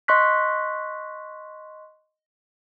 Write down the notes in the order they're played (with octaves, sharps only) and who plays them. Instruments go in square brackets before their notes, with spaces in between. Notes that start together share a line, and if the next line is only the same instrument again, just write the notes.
[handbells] D#5 C6 C#6 F#6 B6